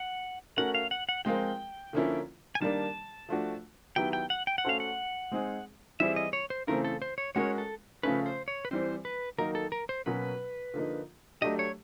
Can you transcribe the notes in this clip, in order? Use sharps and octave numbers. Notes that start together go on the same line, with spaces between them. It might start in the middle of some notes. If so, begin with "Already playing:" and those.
Already playing: F#5
A3 C#4 F#4 A#4 F#5
F5
F#5
F#5
F3 G#3 C4 F4 A#4 G5
D3 F3 A#3 C#4 E4
G#5
D#3 G3 A#3 D4 A5
F3 A3 D4 F#4
D#3 F#3 B3 E4 G4 G5
G5
F#5
G5
F#5
A3 C#4 F#4 A4 C5 F5
F#5
G#3 C4 D#4 G#4
E3 G3 C4 E4 G#4 E5
D#5
C#5
C5
C#3 E3 A3 C4 A#4
A4
C5
C#5
G#3 C#4 F#4 A#4 C#5
A4
C#3 F3 A3 C#4 B4
C5
C#5
B4
E3 G3 C4 C5
B4
D#3 F#3 A#3 D#4 A#4
A4
A#4
C5
B2 F#3 A#3 C#4 B4
D3 F3 A#3 D#4
F#3 A3 D4 G4 D#5
C#5